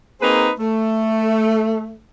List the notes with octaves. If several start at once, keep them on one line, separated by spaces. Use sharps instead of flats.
A#3 C4 D#4 G#4 B4 C5
A3